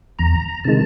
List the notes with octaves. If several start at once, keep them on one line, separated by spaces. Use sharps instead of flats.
E2 A#5
C3 D#3 G#3 A5